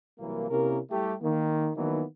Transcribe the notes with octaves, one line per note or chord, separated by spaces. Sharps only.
C2 E3 F#3 A#3
C3 A#3 C#4 E4 A#4
G3 A3 E4 G4
D#3 A#3
D#3 E3 F#3 A#3 B3 D#4